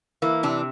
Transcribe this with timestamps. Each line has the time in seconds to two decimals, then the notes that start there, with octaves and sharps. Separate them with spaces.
0.22 E3 A#3
0.43 C3 D4